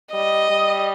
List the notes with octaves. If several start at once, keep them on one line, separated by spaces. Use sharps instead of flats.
G3 D#5
G3